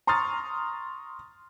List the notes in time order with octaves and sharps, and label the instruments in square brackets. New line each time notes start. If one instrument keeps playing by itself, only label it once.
[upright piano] A#5 C6 C#6 D#6 F6 A6